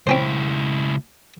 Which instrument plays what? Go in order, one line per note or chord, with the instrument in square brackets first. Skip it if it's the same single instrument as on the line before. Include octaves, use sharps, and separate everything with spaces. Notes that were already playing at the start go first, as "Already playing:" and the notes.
[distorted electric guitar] C#2 E4 [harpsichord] C4 C#4 C5